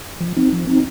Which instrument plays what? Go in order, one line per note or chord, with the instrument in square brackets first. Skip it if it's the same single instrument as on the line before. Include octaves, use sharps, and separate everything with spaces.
[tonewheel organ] F3
C4 D#4
F3
C4 D#4